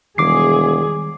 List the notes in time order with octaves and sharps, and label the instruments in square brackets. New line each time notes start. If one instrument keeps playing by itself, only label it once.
[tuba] E1 [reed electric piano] D#3 G3 [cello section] G#4 [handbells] D6 C7